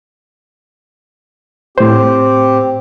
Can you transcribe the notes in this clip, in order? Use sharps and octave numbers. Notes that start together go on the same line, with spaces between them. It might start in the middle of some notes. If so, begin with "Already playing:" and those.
A2 C4 G4 C5